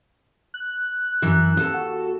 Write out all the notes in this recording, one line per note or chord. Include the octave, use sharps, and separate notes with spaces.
F#6
F#2 E3 E5
D#2 A4
F#4